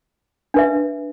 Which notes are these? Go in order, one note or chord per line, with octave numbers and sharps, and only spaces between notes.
D4 B4 E5